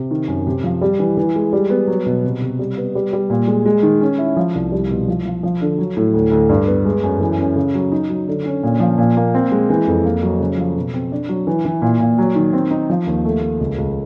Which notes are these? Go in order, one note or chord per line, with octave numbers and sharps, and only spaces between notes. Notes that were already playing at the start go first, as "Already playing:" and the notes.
Already playing: C3
D#3
F#2
C3
F3
G3
E3
E3
G#3
G3
B3
F#3
B2
C3
C3
G3
B3
G3
G3
A#2
G#3
G#3
D#3
C#4
E4
F3
C2
G3
B2
F3
F3
F3
D3
F#3
A2
D2
D2
G2
B3
G#3
F#2
E3
C#4
C#3
F#3
D#4
F#3
D3
C#4
A#2
F3
A#2
A#3
C4
G#3
E3
F2
A#3
F#3
C#3
F3
B2
C4
D4
F#3
E3
E3
A#2
A#2
F#3
D#3
C4
D#4
F3
D#2
A3
A3
C#2
C#2